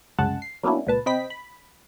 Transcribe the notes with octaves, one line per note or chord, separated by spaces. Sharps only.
C2 F#2 C#3 G#3 F#5 A5
C7
F#3 A#3 B3 C#4 D4 E4
C#2 A#2 B4 A5
C3 C4 D#5 G5 B5 B6
B5